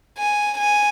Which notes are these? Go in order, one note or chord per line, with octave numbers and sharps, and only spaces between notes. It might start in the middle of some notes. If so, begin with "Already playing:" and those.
G#5
G#5